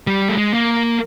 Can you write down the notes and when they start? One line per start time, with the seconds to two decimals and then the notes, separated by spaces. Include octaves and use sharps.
0.07 G3
0.29 A3
0.38 G#3
0.54 A#3